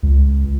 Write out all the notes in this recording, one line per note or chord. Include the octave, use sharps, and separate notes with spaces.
C#2